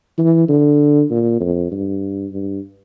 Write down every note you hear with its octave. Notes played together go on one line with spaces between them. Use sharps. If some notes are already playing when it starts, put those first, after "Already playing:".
E3
D3
A#2
F2
G2
G2